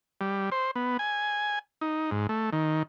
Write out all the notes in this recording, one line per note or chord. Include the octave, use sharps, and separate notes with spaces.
G3
C5
B3
G#5
D#4
G#2
A3
D#3